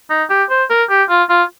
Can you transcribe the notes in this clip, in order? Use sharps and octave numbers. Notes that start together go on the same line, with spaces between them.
D#4
G4
C5
A#4
G4
F4
F4